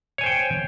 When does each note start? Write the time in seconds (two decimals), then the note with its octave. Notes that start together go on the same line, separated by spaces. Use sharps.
0.18 C#5
0.21 G#5
0.24 C5
0.26 G5